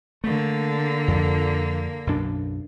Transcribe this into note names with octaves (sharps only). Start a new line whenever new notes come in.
D3 A3 A#3
F2 F3
B1 F#2 D4